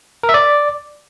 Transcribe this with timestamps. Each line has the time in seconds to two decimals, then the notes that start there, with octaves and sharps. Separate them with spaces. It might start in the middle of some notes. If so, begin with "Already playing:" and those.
0.23 A#4
0.29 E5
0.34 D5